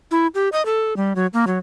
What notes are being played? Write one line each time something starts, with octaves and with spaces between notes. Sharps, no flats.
E4
G4
D#5
A4
G3
F#3
A#3
F#3